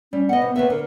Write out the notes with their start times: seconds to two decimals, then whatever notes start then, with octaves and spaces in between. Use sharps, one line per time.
0.13 G3 C#4
0.29 B3 D#5 F#5
0.42 C3
0.56 D#2 B3 B4 E5
0.70 D3 A#4